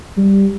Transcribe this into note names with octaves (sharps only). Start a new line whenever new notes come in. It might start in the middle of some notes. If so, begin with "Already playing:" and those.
G3